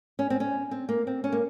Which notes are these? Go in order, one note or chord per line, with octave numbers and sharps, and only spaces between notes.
C#4
C4
C#4
C4
A#3
C4
C#4
A#3